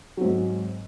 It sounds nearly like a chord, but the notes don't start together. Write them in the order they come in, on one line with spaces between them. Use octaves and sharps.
F#3 C4 G#2 G#3